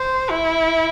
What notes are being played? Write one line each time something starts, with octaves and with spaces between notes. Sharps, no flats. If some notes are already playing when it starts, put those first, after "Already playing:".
Already playing: C5
E4